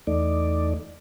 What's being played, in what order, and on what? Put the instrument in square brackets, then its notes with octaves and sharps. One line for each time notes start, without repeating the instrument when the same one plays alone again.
[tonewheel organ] E2 A3 D#4 D5